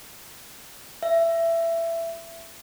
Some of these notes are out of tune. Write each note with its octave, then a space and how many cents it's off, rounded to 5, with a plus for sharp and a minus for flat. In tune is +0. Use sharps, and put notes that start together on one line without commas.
E5 +20